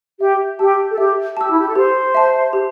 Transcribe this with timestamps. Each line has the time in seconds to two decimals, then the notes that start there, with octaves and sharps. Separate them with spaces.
0.20 G4 E5
0.59 G4 A5 E6
0.91 A4
0.98 G4 E5
1.37 G4 A5 E6
1.50 E4
1.59 G4
1.67 A4
1.75 G4 C5
2.15 E5 A5
2.53 G4